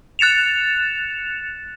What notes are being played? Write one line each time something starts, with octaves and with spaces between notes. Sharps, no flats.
F#6 A6 C#7 E7 F7